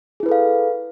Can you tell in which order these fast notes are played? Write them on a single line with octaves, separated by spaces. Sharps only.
G#4 E4 B4 A4 F5